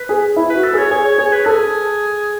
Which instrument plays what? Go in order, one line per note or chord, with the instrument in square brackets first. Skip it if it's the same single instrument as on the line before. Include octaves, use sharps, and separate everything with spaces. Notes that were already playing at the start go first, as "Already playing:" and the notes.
Already playing: [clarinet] B4
[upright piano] G#4
E4
[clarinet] B4
[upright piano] F#4
[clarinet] A4
[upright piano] G#4
[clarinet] C#5
[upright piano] G#4 [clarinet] C#5
[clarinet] C#5
[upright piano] G#4 [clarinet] C#5
[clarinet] B4
[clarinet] G#4 [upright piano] A4